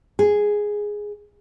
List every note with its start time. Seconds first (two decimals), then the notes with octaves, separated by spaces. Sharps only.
0.19 G#4